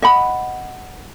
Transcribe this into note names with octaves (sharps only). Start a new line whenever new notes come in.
D#5 F#5 B5